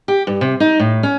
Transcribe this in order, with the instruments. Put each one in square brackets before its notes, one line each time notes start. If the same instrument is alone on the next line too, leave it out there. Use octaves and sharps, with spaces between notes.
[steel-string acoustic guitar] G4
G2
C3
D#4
A2
C#4